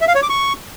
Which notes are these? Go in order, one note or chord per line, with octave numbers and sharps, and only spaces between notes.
E5
F5
C#5
D6
C#6